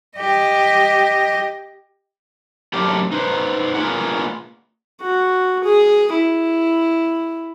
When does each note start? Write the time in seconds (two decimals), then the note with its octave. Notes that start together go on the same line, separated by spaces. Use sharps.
0.18 G4 D#5
2.73 F#3 A3 A#3 C4 D4 G4
3.12 D#4 B4 C5
3.75 A#3 B3 F4 G#4 A#4 F#5
5.01 F#4
5.64 G#4
6.14 E4